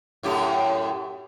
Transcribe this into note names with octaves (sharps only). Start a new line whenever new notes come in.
F#2 A2 G4